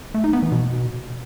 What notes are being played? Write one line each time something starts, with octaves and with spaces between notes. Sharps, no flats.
A3
D#4
B3
E3
B2